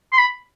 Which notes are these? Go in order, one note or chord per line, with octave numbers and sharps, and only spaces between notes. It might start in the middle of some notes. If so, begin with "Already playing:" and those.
C6
B5